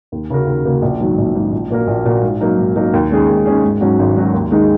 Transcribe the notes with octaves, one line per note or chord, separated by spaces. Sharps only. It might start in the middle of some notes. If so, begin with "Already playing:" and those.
D#2
C#3 A#3 F#4 A#4
D#2
C#3 A#3 F#4 A#4
A#1
G#2 D#3 F#3
A#1
G#2 D#3 F#3
A#1
A#2 A#3 F#4 A#4
A#1
A#2 A#3 F#4 A#4
G#2
F#3 A#3 D#4 A#4
G#2
F#3 A#3 D#4 A#4
D#2
D#3 G#3 C#4 G#4
D#2
D#3 G#3 C#4 G#4
G#1
G#2 F#3 C#4 F#4
G#1
G#2 F#3 C#4 F#4
D#2
D#3 G#3 D#4 G#4